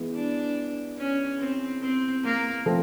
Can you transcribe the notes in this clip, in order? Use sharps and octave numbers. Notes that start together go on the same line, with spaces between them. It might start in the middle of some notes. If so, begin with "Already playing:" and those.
Already playing: E3 G#3 B3
D4
C#4
C4
C4
A#3
F3 A3 C4